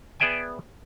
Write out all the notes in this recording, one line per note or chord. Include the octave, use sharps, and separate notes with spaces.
B3 G#4 D5 E5 G5 G#5